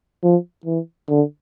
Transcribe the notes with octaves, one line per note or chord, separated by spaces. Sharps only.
F3
E3
D3